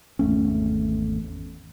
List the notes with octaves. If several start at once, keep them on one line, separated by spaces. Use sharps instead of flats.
G#1 E2 A3 C#4